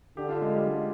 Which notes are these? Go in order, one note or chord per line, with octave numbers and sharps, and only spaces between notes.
D3 G4
F4
G#3
G3
G#3